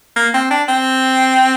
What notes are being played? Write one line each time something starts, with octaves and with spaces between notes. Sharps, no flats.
A#3
C4
D4
C4